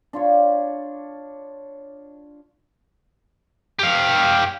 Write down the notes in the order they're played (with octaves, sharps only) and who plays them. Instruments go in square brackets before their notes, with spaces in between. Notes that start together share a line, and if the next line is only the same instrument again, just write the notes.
[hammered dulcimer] D4 F4 C#5
[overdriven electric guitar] G4 F5